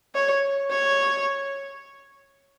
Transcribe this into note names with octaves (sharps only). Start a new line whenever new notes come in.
C#5
C#5